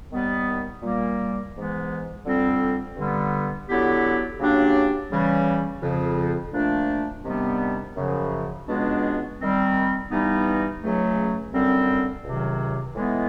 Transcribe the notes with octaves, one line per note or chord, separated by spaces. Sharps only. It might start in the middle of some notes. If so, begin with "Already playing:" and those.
D#2 D#3 G3 B3
A#2 G3 A#3
G#2 E3 G#3 B3
F2 D3 G3 C4
G2 D3 G3 B3
D3 F#3 B3 E4 G4
C#3 F#3 A#3 D4 G4
C#3 E3 G3
F2 C#3 F3
A#2 F3 A3 D4
C3 D#3 G3 B3 D4
F#2 C#3 F3
C#2 B2 G#3 B3 D4
D#3 G3 C4
G2 E3 G3 B3 D#4
C#2 C#3 F#3 A3
F#2 D3 G3 C4
C#2 C3 D#3 F#3
A2 E3 G#3 B3 D#4